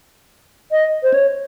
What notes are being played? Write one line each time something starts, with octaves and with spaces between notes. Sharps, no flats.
D#5
C5
C#5